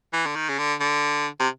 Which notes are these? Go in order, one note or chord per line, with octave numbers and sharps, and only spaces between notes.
E3
D3
D#3
C#3
D3
D3
C3